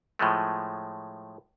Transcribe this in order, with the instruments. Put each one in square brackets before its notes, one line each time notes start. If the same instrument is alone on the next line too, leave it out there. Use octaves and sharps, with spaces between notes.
[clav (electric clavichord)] A2 F3 G#3 A3